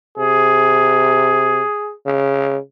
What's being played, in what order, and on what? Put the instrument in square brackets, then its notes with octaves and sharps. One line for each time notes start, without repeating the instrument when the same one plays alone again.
[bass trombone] C3 [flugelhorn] G#4
[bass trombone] C#3